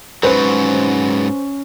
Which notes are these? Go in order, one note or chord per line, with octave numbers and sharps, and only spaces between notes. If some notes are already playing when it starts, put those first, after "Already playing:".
G#2 F#3 C#4 B4 C5